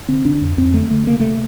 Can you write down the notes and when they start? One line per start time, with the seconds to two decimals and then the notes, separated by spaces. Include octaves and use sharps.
0.09 D3 C4
0.25 D3 D4
0.41 F2
0.58 F2 C4
0.74 D3 A3
0.90 D3 A3
1.07 C3 A#3
1.20 C3 A3